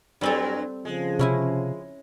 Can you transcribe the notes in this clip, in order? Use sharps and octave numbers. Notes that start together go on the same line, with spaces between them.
G2 F#3 G3 C4 A4
C#3 F3 G#3
C3 C#4 E4 G#5